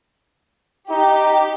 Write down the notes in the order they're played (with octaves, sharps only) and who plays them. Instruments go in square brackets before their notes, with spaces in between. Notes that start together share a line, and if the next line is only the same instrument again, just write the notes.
[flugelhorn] D#4 [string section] G4